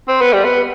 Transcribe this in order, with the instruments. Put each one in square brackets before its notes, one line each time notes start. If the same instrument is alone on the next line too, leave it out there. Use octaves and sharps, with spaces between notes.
[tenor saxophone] C4
B3
G3
B3